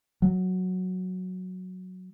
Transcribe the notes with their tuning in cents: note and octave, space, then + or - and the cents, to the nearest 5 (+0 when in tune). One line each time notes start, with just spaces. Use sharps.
F#3 -5